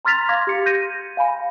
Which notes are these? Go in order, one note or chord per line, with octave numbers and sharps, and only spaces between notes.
A#5 C6 F6 A6 B6 F7
F5 C6 D6 G#6 A#6
G4 C#7
G6 A#6 D#7
F5 G#5 B5